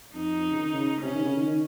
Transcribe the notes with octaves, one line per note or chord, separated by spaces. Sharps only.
F2 D#4
F2
C#3
D#3
C#3
C3 C#4
D#3
C#3
D#3
D#3